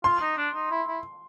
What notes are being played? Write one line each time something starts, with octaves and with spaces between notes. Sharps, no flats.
F4 C6
D#4
D4
D#4
E4
E4